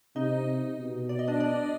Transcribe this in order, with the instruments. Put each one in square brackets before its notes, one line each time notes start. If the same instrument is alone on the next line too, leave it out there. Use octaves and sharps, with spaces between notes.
[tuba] C3 [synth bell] D#4 D#5
[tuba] B2
[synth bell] D5
D#5
D4 D5
D4 D5